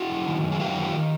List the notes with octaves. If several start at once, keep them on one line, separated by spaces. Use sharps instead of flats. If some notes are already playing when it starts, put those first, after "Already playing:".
Already playing: E4 F#4
F#2
D#3
F#2
G#4
F#2 F4 G4
D#3